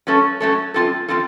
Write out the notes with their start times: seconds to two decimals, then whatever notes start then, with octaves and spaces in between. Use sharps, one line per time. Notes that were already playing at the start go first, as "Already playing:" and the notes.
0.07 F#3 A3 C#4 A4
0.40 F#3 A3 C#4 A4
0.74 F#2 F3 C4 F4 A4
1.08 F3 C4 F4 A4